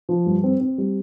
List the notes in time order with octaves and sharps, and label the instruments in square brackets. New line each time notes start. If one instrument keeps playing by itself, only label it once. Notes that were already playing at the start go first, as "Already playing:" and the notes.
[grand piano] F3
G2
C4
C4
G3